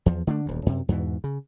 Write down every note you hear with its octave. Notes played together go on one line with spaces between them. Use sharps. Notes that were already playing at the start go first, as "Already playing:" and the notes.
E2 F3
D3 A3 C4 D4
D#1 D2
F#2 C3
E2 G#2 B2 E3
C#3